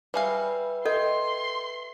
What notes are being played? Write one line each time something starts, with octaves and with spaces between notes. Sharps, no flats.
G3 G#4 B4 E5 F5
A4 D#5 G5 C6